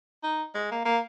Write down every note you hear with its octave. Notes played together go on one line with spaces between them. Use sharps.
D#4
G#3
A#3
A#3